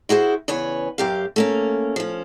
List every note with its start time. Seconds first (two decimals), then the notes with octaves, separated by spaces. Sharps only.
0.09 E4 F#4 G#4 C5
0.48 E2 C#3 B4 C#5 G#5
0.98 F#2 G4 F5
1.36 A3 A#3 C#4
1.96 F3 C#4